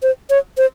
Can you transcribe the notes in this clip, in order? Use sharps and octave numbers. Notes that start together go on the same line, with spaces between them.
C5
C#5
C5